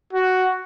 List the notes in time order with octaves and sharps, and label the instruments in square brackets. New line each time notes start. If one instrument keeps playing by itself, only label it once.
[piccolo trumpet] F#4